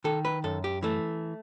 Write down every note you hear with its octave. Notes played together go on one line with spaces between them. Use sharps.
D#3 A4
B4
F#2 A4
G4
E3 A3